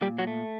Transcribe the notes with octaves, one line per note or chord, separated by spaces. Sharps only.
A#2 G3 G4
F#3 F#4
A3